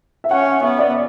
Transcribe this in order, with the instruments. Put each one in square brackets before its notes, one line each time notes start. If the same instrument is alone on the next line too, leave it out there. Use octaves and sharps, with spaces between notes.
[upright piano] E5
[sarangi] C#4 [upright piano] F#5
[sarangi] B3 [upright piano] E5
[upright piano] D5